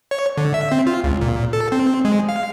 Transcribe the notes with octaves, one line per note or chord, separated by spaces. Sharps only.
C#5
D3
E5
C4
F4
C#2
A#2
A4
C4
G#3
F5